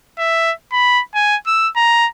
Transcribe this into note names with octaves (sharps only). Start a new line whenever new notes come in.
E5
B5
G#5
E6
A#5